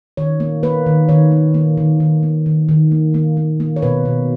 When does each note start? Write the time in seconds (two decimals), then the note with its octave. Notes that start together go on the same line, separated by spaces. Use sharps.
0.17 D#3 C#5
0.40 A#3
0.63 A#3 B4
0.86 D#3
1.09 D#3 C#5
1.31 A#3
1.54 A#3
1.77 D#3
2.00 D#3
2.23 A#3
2.46 D#3
2.69 D#3
2.92 A#3
3.14 A#3
3.37 A#3
3.60 A#3
3.76 C#5
3.82 B2 B4
4.05 B2